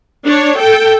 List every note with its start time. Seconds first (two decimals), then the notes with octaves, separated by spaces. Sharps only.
0.24 D4 C#5
0.58 A4 G5